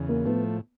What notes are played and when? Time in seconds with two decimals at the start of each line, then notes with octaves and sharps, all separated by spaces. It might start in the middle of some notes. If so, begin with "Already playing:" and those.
Already playing: E2 C#3
0.09 A#3
0.26 A2 F3 A3 B3